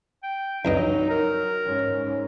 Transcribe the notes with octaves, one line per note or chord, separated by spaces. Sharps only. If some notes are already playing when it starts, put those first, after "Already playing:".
G5
C2 G2 F#3 D#4 D#5
A#4
G#2 C#4